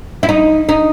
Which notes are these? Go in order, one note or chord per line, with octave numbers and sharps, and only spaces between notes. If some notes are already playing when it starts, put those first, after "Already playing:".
E4
D#4
D#4